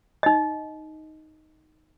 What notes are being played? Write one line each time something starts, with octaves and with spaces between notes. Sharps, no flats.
D#4 D#5